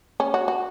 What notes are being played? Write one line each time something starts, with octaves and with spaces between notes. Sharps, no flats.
C#4
F#4
F#4